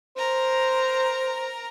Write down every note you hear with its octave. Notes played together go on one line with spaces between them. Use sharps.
A#4 C5 A#5